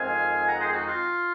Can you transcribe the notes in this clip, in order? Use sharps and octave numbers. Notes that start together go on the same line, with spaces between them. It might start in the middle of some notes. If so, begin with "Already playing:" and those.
Already playing: F2 D#3 G#3 C4 F5 G#5
F#5 A#5
G#4 C5
D#4 F#4
F4